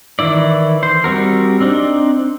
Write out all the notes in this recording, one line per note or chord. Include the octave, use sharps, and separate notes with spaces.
D#3 E3 E4 D5
C5
G3 C4 F#4 A#4
C4 D4 D#4